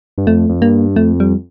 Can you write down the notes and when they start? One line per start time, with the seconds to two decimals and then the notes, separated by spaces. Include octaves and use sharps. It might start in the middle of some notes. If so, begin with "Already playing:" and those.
0.18 G2
0.27 F2 A3
0.50 F2
0.62 G2 A#3
0.96 F2 A3
1.20 G3